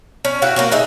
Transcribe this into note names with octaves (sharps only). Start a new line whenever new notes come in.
C#4
E4 F#4 F5 G5
A#3 C#4 F#4
D#4 G#4 E5